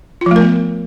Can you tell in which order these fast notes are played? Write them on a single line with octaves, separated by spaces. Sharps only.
F4 F3 A3 A#4 B3